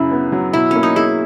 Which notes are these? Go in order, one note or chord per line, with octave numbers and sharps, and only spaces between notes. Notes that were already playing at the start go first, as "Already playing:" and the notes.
Already playing: F#2 C#3 E4
B3
F#3
B2 E4
A#3 C#4
D#4
E4 G#4